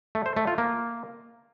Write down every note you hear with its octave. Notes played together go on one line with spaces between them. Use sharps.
A3
C5
A3
F4
A#3